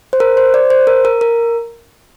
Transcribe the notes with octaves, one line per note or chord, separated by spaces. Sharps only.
C5
A#4
C5
D5
C5
A#4
A#4
A#4